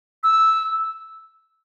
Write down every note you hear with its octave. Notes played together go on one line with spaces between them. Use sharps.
E6